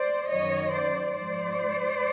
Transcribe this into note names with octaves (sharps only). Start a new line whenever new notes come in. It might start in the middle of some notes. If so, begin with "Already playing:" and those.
Already playing: C5 D5
F#2 D#3 F#3 C#5 D#5
C5 D5
G#2 F3 C5 D5